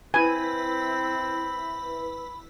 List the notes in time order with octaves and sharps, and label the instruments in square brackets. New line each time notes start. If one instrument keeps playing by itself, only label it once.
[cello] C4 [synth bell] E4 B4 [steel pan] G#5 [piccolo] B5